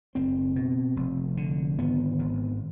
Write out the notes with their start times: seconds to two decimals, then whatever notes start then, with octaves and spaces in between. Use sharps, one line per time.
0.15 F#1 C4
0.56 B2
0.96 F1
1.37 D3
1.79 G#1 B3
2.19 G#1